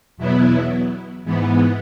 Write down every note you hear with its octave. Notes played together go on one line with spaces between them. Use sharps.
E2 B2 F#3 B3 E4
G#2 E3 B3